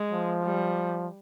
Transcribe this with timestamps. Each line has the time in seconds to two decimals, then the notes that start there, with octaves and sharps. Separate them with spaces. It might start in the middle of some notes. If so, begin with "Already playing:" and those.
Already playing: G#3
0.13 F3
0.44 G3